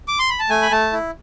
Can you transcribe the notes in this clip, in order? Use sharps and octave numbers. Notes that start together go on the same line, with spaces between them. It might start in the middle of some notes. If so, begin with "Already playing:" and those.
D6
C6
B5
A5
A3 G#5
B5
A3 A5
E4